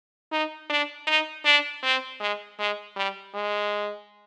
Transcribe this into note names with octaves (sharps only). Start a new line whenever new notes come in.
D#4
D4
D#4
D4
C4
G#3
G#3
G3
G#3